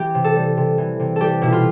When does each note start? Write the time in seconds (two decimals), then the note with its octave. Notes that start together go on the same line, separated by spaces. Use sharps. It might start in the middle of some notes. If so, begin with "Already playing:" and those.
Already playing: E3 G4
0.14 C3
0.24 A4
0.36 G3
0.57 C3
0.78 E3
1.00 C3
1.16 G3 G4 A4
1.42 B2 E4
1.52 F4